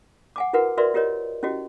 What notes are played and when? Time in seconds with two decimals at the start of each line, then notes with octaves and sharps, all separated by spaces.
0.36 F#5 G#5 D6
0.53 E4 F#4 A#4 B4 F#5
0.77 F#4 A#4 B4 D5 E5 C6
0.94 F4 G4 A#4 C#5 D#5
1.43 C#4 E4 F#4 G4 D#5